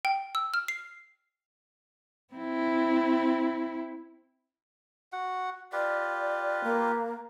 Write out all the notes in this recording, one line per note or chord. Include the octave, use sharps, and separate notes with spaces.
G5
E6
F6
C7
C4 E4
F#4 F#5
F4 G4 B4 D5
A#3